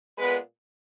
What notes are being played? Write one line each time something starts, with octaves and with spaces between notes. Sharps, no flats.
A#2 G#3 B3 B4